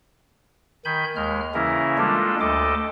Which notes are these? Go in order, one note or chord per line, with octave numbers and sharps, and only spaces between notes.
D#3 G#5 B5 G6
D#2 G#3 F6
C#3 E3 A#3 C#4 E4 A#4
G3 G#3 A#3 D4 F4 A4
D2 A4 D#5 D6